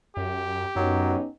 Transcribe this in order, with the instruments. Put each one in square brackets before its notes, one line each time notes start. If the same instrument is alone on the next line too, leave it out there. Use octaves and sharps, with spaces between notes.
[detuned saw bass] F#2 [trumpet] G4
[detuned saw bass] F#2 [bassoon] F#3 [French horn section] B3 C#4 D#4